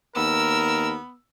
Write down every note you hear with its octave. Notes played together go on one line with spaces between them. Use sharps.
D#2 B3 A#4 E6